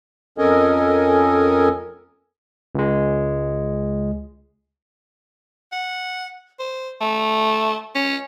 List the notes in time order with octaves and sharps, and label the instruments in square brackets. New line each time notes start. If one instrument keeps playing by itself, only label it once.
[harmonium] F2 C#4 A4 A#4 D#5 G#5
[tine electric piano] C#2 G#3
[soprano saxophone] F#5
C5
A3
C#4